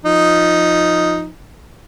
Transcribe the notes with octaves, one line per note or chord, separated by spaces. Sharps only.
F3 D#4